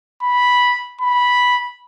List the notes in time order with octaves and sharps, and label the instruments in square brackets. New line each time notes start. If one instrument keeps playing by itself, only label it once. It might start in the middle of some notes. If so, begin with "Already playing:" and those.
[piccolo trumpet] B5
B5